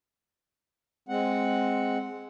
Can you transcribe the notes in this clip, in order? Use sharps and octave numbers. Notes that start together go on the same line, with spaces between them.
G#3 C4 F#5